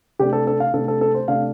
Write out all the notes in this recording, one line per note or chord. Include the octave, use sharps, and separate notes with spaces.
C3 A3 D4 G4
A4
A4
F5
C3 A3 D4 A4
A4
A4
C5
C3 A3 D4 F5